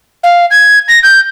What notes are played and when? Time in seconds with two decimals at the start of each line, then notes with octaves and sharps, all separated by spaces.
0.24 F5
0.51 G#6
0.88 A#6
1.03 G6